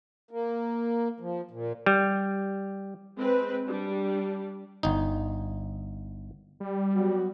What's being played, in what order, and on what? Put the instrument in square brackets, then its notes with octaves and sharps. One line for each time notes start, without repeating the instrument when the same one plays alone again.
[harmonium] A#3
F3
A#2
[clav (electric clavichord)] G3
[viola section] G#3 C4 B4
G3 D4
[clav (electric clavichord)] G1 D#4
[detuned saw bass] G3
[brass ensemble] F#3 B3 F#4